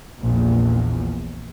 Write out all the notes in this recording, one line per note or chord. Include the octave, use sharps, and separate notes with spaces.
A#1 E2 A#2